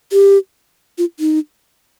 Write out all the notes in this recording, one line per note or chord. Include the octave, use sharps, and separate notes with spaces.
G4
F4
D#4